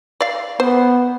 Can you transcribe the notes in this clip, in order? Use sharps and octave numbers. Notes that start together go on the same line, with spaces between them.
D5 F5
B3 C5